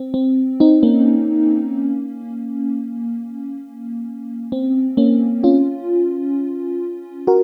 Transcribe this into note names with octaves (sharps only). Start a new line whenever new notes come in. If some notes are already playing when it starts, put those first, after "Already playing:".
Already playing: C4
C4
C4 D#4
A#3 C#4
C4
A#3 C#4
C#4 F4
F#4 A#4